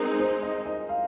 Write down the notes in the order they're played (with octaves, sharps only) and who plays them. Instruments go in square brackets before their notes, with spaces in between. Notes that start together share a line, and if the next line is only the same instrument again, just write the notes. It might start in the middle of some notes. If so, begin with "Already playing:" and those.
Already playing: [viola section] G#3 C4 D#4 [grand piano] G#4 A#4
[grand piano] C5
D#5
D#5
F5